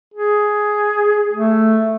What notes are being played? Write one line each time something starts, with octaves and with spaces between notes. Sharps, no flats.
G#4
A3